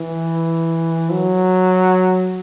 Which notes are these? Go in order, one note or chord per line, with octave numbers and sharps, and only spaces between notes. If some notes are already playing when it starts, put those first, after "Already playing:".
Already playing: E3
F#3